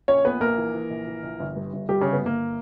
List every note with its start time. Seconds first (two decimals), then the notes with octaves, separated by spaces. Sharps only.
0.08 A#1 C#4 C#5
0.24 A#2 B3 B4
0.40 A#1 A#3 A#4
0.58 E3
0.74 E3
0.90 A#1
1.07 E3
1.23 A#1
1.39 G1
1.56 G2
1.73 G1
1.89 G2 G3 G4
2.01 G1 C#3 C#4
2.13 B3
2.22 G1 A#3